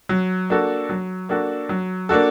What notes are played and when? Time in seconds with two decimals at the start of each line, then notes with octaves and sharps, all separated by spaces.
0.09 F#3
0.50 A#3 D4 F#4 A4
0.89 F#3
1.29 A#3 D4 F#4 A4
1.69 F#3
2.09 A#3 D4 F#4 A4